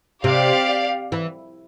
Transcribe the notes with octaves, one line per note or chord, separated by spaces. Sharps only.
C3 G4 D5 F5
E3